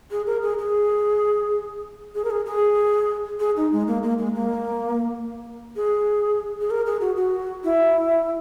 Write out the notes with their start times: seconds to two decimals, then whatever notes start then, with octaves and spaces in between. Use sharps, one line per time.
0.11 G#4
0.26 A#4
0.43 G#4
0.58 G#4
2.15 G#4
2.25 A#4
2.30 G#4
2.46 G#4
3.40 G#4
3.57 D#4
3.72 G#3
3.87 A#3
4.03 A#3
4.18 G#3
4.35 A#3
5.76 G#4
6.61 G#4
6.70 A#4
6.86 G#4
7.01 F#4
7.17 F#4
7.64 E4